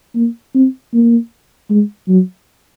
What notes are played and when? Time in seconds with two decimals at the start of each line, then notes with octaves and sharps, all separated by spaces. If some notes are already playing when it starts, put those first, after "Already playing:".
0.16 A#3
0.55 C4
0.94 A#3
1.70 G#3
2.09 F#3